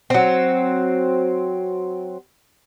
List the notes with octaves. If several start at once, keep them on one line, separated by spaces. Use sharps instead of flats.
F#3 C4